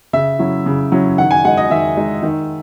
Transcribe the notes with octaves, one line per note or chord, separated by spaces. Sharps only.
C#3 E5
F#3 C#4 E4
C#3
F#3 C#4 E4
D#3 F#5
G#5
G#3 D#4 F#5
D#5
D#3 E5
G#3 D#4
D#3